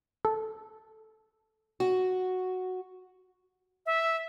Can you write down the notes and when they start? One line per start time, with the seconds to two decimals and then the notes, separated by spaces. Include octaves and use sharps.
0.25 A4
1.80 F#4
3.86 E5